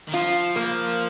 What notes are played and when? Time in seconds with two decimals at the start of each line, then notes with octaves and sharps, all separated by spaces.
0.09 D#3
0.13 F3 F4
0.56 A#3